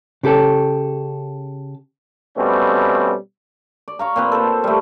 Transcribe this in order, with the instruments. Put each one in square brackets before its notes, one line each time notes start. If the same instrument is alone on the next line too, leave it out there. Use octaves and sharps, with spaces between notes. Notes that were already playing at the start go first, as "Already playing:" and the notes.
[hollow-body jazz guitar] C#3 G4 A4
[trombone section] B2 G3 A3 C4 C#4
[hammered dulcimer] D5
C#5 F5 A#5
A#2 C4 B4
A4 C5
G3 A3